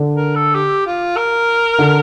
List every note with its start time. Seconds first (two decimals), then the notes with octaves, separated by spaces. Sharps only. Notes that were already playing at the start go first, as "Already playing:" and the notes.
Already playing: D3
0.15 A#4
0.35 A4
0.55 G4
0.87 F4
1.17 A#4
1.79 D3